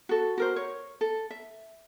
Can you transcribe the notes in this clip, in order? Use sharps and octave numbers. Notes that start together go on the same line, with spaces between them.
F#4 A4
F#4 A#4 C5
C#5
A4
E5